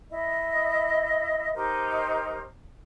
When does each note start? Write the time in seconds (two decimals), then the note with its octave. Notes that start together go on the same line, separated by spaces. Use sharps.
0.10 E4 D#5
1.55 D#4 G4 A#4 C5